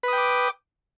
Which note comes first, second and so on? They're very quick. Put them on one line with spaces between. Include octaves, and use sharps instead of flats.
B4 D#6 G5 D6